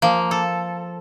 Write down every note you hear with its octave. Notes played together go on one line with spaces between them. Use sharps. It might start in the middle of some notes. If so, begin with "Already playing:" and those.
F3 A#3
A4